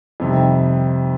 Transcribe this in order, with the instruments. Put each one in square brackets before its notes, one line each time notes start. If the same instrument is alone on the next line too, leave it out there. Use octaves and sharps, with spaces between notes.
[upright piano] F2 C3 D#3 G3